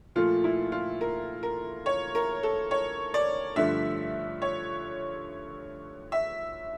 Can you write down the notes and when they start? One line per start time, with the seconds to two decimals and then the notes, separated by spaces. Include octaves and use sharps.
0.15 A#2 F3 A3 F4
0.44 E4
0.72 F4
1.01 A#4
1.43 A#4
1.86 C#5
2.15 A#4
2.43 A4
2.71 C#5
3.14 D5
3.56 G2 D3 F3 A3 E5
4.42 C#5
6.12 E5